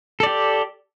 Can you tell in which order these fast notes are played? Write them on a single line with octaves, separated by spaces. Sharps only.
A4 D5 G4